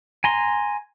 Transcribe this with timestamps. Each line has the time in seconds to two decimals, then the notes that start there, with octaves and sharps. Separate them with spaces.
0.24 G#5 A#5 C6